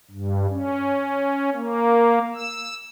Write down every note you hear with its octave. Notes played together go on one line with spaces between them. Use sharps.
G2
C#4
A#3
E6